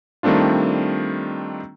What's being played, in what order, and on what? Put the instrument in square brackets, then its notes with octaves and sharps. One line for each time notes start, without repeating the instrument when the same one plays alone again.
[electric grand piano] D#3 G3 A3 C4 D4 F4